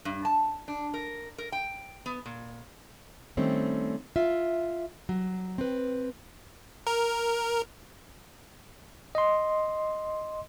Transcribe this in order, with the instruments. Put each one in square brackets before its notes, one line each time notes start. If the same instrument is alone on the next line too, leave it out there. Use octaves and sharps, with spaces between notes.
[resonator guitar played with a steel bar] G2
A5
D4
A#4
A#4
G5
B3
A#2
[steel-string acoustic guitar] D#3 G3 A3 C4 C#4
F4 E5
F#3
C4 B4
[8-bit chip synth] A#4
[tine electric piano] D#5 C6